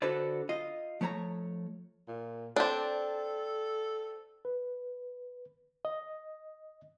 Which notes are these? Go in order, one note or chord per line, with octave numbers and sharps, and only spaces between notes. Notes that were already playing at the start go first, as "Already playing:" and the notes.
D3 F#4 A4 B4 C5 D5
F4 D#5
F3 A3 C#5 A5 A#5
A#2
C4 D4 A4
B4
D#5